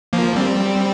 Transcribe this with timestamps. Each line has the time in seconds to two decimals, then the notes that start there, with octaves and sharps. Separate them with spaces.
0.13 F3 A#3
0.36 G3 C4